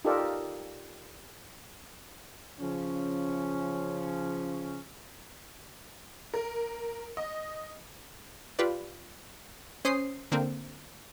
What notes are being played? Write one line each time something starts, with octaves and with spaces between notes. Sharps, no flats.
D#4 F4 G4 A4 A#4 D5
C#3 F3 C#4
A#4
D#5
F4 G4 B4 D5
C#4 C5 D#6 C7
D3 A#3 C4